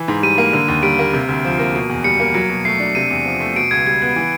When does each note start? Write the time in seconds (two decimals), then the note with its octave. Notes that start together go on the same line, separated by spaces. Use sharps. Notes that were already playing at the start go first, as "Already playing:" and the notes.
Already playing: E3
0.08 G#2
0.23 G3 D#7
0.38 A#3
0.53 D3
0.68 D#2
0.83 G3 D7
0.99 A#3
1.14 C3
1.29 D2
1.45 F3
1.59 A#3
1.74 B2
1.90 E2
2.04 G3 C#7
2.20 A#3
2.34 F#3
2.49 B2
2.65 A3 C7
2.80 D4
2.95 C3 D#7
3.10 E2
3.26 F3
3.40 A3
3.56 B2 D7
3.71 C#2 G#6
3.86 G3 G#6
4.02 B3
4.16 E3